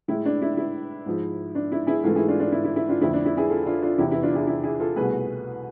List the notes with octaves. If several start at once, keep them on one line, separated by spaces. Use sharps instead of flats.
A2 G#3 E4
D4
E4
E4
G#2 F3 G#3
D4
E4
E4 G#4
G#2 E3 A3 F4 A4
E4 G#4
D4 F4
D4 F4
E4
E4
E4
D4 F4
F2 D3 A3 E4
D4
E4
E4 G#4
F4 A4
D4 F4
D4 F4
E2 C3 E3 E4
E4
D4 F4
E4 G#4
E4
E4 G#4
F4 A4
C2 B2 A3 G#4 B4